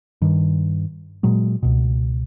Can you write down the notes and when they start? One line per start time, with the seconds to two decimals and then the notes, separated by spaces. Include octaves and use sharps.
0.22 G2 D#3
1.23 A#2 F#3 G#3
1.63 C#2 B2